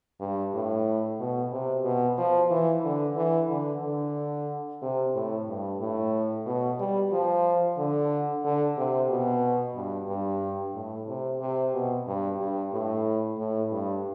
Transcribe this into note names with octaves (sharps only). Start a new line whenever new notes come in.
G2
A2
B2
C3
B2
F3
E3
D3
E3
D3
D3
C3
A2
G2
A2
B2
G3
F3
D3
D3
C3
B2
G2
G2
A2
C3
C3
B2
G2
G2
A2
A2
G2